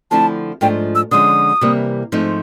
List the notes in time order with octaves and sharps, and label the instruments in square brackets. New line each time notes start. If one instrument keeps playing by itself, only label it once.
[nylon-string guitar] D3 F3 A3 C4 E4 [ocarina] A5
[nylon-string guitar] G#2 F3 A3 D4 F4 [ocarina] G5
[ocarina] E6
[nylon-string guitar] D3 F3 G#3 C#4 [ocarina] D#6
[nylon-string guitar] C3 E3 G3 A#3
G#2 F3 A3 C4 D#4